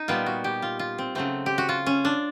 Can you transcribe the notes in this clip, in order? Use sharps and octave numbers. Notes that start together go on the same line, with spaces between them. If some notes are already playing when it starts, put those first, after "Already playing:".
Already playing: D#4
A#2 G3 B3 F4
F#4
G4
F4
F4
C4
C#3 F#3 A3 C4
G4
F#4
F4
C#4
D4